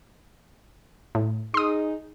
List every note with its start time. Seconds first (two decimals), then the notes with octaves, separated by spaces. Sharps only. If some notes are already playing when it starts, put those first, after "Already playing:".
1.15 A2
1.54 D#4 G#4 C6 D#6